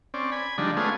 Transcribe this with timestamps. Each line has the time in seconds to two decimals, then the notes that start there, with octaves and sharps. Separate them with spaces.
0.14 C4 C#4 D5
0.32 G#5 B5
0.58 D3 F3 G3 G#3 D4 D#4
0.77 G#3 A3 B3 C#4 F4 G#4